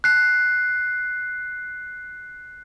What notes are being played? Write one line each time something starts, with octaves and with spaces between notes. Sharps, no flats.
F#6 C7